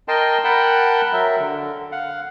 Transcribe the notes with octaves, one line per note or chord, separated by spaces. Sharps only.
A#4 D#5 G5 A5 C6
A#4 F#5 G5 A5 B5
F#3 A#4 E5
D3
F5 F#5